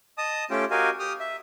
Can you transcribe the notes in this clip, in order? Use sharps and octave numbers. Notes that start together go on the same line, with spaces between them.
D#5 A5 D#6
A3 C#4 F4 G4 G5
F#4 G4 A#4 D#5 F5 G#5
G4 D#6 F6
E5